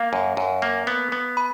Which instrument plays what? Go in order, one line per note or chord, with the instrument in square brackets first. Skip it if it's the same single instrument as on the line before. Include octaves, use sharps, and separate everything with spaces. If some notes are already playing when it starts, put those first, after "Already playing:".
Already playing: [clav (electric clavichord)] A#3 [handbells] F5
[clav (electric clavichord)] F#2
F#2
A#3
B3
B3
[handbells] B5